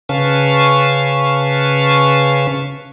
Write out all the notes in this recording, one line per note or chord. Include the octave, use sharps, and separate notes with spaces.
C#3 C#4 B4 F5 A5 C#6